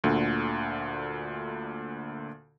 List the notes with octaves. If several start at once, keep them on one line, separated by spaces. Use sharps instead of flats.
D2 A#2 D3